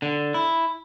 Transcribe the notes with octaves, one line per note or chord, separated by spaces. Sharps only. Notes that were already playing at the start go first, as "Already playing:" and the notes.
D3
E4